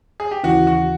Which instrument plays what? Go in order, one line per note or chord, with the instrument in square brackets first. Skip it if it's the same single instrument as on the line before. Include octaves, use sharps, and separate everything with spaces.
[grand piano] G#4
G4
[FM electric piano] D#2 C#3 E3 [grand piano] F#4
[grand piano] F#4